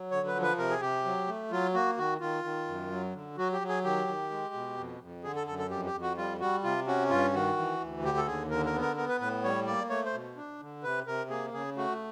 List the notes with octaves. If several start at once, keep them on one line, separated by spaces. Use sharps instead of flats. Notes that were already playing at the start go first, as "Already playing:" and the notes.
Already playing: F#3
D3 C#5
B4
F3
B4
C3 A#4
G#4
C3 G4
F#3
A3
F#3 F4
A#3 F#4
D#3 F#4
D#3 F4
D#3
F#2
F#3
D3
F#3 F#4
G4
F#3
G#4
D#3 G4
D#3
G#3
B2
F2
F2
D3 G#4
A4
F#2 A4
A4
F2 G4
G4
F2
F#4
G3 F4
G3 F#4
C3 F4
C#4 F#4
G2 F4
D#3 F#4
E3
D2
D3 G4
A4
D#2 G#4
D3 A#4
A#4
B3
A#4
B3 A#4
B4
A2 B4
G3 C#5
A#3 D5
A3 C#5
C5
B2
D4
D3
C3 B4
C3 A#4
A#3 G#4
C#3 G#4
A3 F#4